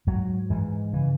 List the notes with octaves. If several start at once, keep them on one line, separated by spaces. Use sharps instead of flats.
G#2 F#3
G#2 E3
C#3 E3